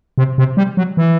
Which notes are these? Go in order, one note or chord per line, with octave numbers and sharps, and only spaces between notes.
C3
C3
G3
F#3
E3